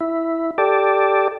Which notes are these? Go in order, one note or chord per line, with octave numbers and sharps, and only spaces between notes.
E4
G4 A4 D5